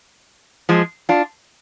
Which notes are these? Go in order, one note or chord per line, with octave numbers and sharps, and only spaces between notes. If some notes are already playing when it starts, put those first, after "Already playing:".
F3 G#3
D4 F4